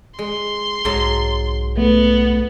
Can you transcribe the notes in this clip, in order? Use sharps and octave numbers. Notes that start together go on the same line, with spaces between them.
G#3 C6
B1 G#2 F#3 A5
A3 B3